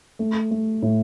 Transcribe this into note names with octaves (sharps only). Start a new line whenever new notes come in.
A3
A3
A2